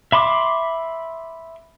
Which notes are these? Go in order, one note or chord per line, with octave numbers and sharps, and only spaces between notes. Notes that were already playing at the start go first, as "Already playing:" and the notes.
E5 B5 C6 D6